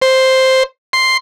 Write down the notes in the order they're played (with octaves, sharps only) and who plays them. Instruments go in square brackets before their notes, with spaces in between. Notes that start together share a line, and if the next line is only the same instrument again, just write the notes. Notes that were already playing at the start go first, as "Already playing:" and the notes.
[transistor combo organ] C5
C6